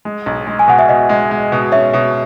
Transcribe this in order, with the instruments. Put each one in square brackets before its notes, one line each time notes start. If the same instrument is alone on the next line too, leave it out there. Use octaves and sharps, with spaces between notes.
[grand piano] G#3
B1
G#3
[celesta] G#5
[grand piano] B2 [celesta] F#5
[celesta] E5
[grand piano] B2 [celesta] D#5
[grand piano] G#3
G#3
B2
[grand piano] C#4 [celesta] E5
[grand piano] B2